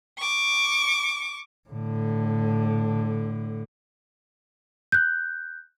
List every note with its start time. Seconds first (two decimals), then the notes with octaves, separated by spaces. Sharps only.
0.19 C#6 D6
1.69 A2 D3
4.92 F#6 G6